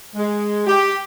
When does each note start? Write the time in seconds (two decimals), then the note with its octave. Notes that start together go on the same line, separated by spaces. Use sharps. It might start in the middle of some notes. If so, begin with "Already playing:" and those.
0.15 G#3
0.67 G4